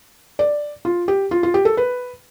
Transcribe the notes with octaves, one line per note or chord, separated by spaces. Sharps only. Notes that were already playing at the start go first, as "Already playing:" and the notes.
D5
F4
G4
F4
F4
G4
A4
B4